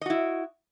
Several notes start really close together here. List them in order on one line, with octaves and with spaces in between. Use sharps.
D#5 F#4 E4